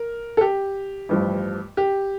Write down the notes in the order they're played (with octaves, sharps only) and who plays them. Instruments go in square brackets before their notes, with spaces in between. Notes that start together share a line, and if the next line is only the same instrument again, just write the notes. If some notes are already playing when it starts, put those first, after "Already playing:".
Already playing: [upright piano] A#4
A4
G4
A1 G2 F3
G4